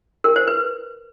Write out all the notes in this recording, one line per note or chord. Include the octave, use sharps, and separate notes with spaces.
A#4
C5
B4